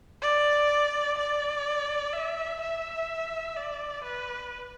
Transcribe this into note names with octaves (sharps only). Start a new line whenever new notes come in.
D5
D5
E5
E5
D5
B4